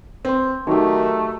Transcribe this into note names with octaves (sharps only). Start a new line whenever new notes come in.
C4 B4 C6
D#3 F#3 A3 D#4 G4